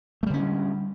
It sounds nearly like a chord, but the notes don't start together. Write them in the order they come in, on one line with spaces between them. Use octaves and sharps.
A3 G3 D3 C#4